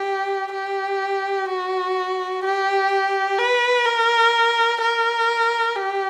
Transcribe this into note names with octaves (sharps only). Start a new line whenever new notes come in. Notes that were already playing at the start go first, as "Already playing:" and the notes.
Already playing: G4
G4
F#4
G4
B4
A#4
A#4
G4